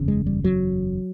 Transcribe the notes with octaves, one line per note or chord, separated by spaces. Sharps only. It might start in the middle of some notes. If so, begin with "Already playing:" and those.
Already playing: F#1 E2 C#3
G#3
G3
F#3